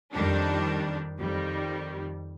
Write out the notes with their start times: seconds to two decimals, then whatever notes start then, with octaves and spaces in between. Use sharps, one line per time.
0.12 F2 D#3 G3 D4
1.17 F2 D#3 G3